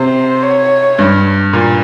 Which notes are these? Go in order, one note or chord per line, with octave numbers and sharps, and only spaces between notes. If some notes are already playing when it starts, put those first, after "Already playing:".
Already playing: C3 C5
C#5
G2
A#2